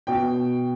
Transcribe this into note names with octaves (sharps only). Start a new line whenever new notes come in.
B2 G5